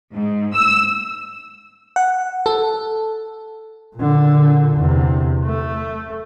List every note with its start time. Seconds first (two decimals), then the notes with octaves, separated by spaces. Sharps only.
0.14 G#2
0.55 E6
1.96 F#5
2.46 A4
3.96 A#2 D3
4.77 E2 C3
5.45 A3